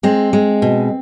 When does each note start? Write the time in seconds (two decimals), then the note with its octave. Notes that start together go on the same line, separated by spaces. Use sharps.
0.03 G#3 C4
0.33 G#3
0.62 B2